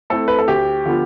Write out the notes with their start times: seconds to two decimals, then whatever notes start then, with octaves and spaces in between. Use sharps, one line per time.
0.10 A3 C4 E4 A4
0.28 B4
0.38 A4
0.48 D2 G4
0.86 D3 F3 B3 F4